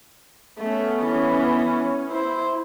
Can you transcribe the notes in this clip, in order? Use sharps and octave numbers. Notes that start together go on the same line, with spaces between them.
A3 B3 C#4
E3
E4 C5